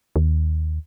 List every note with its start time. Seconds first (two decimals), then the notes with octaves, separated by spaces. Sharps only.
0.16 D#2